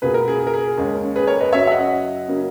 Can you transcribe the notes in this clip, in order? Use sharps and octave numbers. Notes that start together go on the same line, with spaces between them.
C#2 B2 A#3 G#4 B4
A#4
G#4
G#4
A#4
G#4
D#2 C#3 G#3 C#4
G#4 B4
A#4 C#5
B4 D#5
F#2 C#3 F#3 C#5 E5
E5
D#5 F#5
C#3 F#3 A#3 C#4